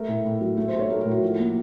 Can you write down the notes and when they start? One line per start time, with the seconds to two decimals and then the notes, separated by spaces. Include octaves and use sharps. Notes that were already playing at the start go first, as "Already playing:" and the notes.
Already playing: A3 A#4
0.08 A2
0.25 A2
0.41 F#3
0.57 A3 A4
0.68 C5
0.73 A3
0.79 C#5
0.90 A3 A#4
1.01 A#4
1.05 A2
1.11 F#4
1.22 F3
1.39 A#3